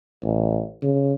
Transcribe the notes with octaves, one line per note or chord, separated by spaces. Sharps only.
A1
C#3